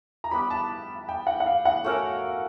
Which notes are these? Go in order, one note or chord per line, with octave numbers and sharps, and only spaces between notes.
A#5
G3 B3 D4 G4 B5
A5
G5
F#5
F#5
F5
F#5
A3 C#4 F#4 A#4